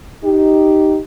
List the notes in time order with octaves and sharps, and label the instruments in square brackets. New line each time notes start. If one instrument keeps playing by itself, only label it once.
[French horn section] D#4 G4